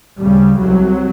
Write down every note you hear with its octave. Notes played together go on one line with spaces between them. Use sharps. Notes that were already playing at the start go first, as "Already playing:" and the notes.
D2 C#3 G3
C2 C3 F#3